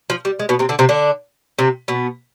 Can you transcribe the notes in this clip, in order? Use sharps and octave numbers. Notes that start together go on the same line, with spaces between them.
F3
G3
G#3
B2 B3
C3 C4
D3 D4
C3 C4
D3 D4
C3 C4
B2 B3